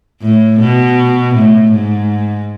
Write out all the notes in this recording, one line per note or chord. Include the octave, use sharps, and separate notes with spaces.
A2
B2
A2
G#2